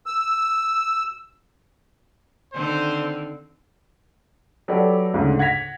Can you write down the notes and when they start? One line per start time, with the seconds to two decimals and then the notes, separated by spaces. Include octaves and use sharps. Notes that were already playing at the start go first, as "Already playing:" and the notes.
0.06 E6
2.53 D3 D#3 C4 C5
4.68 F#3 G4 A4 B4 D5
5.14 D2 G#2 C#3
5.39 F#5 G#6 A#6 B6 F7